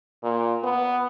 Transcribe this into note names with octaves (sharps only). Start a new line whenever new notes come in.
A#2
B3